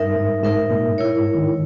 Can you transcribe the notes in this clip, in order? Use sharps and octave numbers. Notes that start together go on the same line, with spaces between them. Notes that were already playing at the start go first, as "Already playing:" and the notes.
Already playing: G2 D#4 A#4 E5
G#2
G#2 D#4 A#4 E5
A#2
E4 A#4 C#5
G#2
D#3